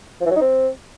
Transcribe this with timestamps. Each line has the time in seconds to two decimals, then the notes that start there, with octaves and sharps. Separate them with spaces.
0.20 F3
0.26 E3
0.31 F#3
0.36 D#4
0.41 C4